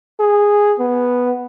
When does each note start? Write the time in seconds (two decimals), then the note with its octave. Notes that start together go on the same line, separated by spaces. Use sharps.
0.20 G#4
0.79 B3